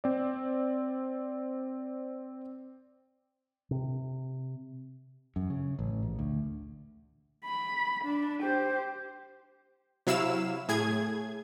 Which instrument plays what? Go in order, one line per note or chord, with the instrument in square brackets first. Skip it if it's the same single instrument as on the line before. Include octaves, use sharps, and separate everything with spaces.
[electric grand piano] C4 D5
[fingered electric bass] C3
F#2
C#3
A1
A#1
D2
[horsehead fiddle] B5
D4
G4 C5
[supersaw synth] C3 F#3 E4 F5 E6 E7
A2 G#4 G#6